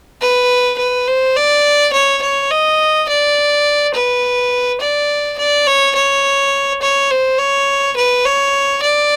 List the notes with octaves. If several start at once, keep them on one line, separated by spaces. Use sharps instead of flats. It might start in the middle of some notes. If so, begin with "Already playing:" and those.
B4
B4
C5
D5
C#5
C#5
D#5
D5
B4
D5
D5
C#5
C#5
C#5
C5
C#5
B4
C#5
D5